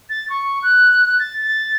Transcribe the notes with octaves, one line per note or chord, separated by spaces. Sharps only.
A6
C#6
F#6
A6
A6